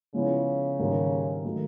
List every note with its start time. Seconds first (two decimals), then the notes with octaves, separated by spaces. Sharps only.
0.14 C#3 F3 G#3 B3 E4
0.79 G#2 D#3 G3 A#3 D#4
1.44 D#3 F#3 A3